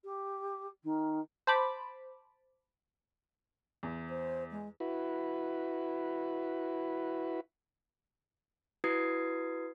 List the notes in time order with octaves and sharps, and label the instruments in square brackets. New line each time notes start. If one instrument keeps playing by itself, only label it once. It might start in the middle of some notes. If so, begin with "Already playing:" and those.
[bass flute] G4
D#3
[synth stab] C5 A5 B5 D6
[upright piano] E2
[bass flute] C5
G#3
[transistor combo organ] E4 F#4 B4
[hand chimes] E4 F#4 B4 D#6 G#6 C7